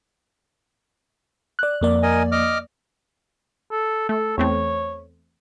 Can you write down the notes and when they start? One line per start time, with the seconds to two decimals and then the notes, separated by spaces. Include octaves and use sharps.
1.59 D5 F#6
1.81 F2 A#3 D5
2.03 A#4 D#5 G#5
2.32 D#5 D6 F6
3.71 A4
4.09 A3 A4
4.38 E2 A3 C4 C#5